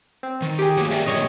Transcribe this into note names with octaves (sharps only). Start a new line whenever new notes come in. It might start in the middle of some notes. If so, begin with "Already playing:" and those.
C4
D#3
G4 G#4
F#3 A#3
A#4 D5 E5
A#2 D3 G#3 C#5 D#5